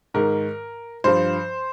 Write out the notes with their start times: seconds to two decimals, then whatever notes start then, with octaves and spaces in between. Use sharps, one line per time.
0.14 G#2 D#3 A#4
1.04 G2 F3 C5